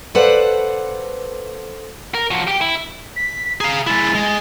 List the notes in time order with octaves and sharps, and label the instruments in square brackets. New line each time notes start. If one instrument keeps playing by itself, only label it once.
[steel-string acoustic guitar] A4 B4 C5 D5 F5 F#5
[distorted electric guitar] A#4
F3 F#4
G4 G5
E4
[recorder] B6
[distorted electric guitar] G#4 F5 [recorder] A#5
[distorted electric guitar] G#3 E4 [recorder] A6
[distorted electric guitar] G#3